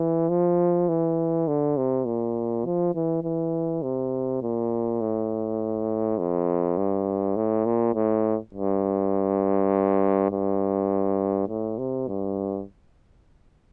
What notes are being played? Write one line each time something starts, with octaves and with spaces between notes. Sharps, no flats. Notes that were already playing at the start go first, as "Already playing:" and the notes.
Already playing: E3
F3
E3
D3
C3
A#2
F3
E3
E3
C3
A#2
A2
F2
G2
A2
A#2
A2
G2
G2
A2
C3
G2